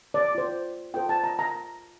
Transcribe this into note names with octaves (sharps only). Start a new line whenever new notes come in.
D5
F4 C5
F4 A4 C5 G5
A5
A#5
A#5